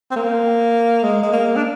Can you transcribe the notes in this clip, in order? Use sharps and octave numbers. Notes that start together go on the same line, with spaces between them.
C4
A#3
G#3
G#3
A#3
D4